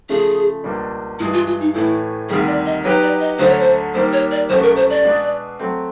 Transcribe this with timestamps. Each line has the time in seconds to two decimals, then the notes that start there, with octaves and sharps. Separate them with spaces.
0.09 C#3 F3 A3 G#4
0.64 C#2 B2 G3 A#3 D4
1.19 G2 E3 G#3 E4
1.33 F4
1.47 F4
1.60 D#4
1.74 A2 E3 A3 E4
2.29 D2 C3 D#3 G3 G#4
2.47 D5
2.66 D#5
2.84 F#3 B3 D#4 G4 B4 C#5
3.03 D5
3.21 D#5
3.39 D2 D3 F#3 A3 C5
3.49 C#5
3.60 C5
3.94 D#2 D#3 G3 A#3 C5
4.13 C#5
4.31 D5
4.49 C2 B2 F#3 A3 C#4 C5
4.62 A#4
4.76 C5
4.90 D5
5.04 B2 G#3 B3 D4
5.59 F#3 A3 C4